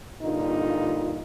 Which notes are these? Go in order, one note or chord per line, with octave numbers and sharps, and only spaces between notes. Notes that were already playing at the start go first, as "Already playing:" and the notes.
G2 A#2 D3 D#4 F4